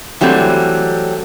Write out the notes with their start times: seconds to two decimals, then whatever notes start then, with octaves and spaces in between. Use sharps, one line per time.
0.21 E3 F#3 G3 A3 C4